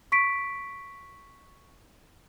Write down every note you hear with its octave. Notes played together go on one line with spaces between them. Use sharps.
C#6 B6 D7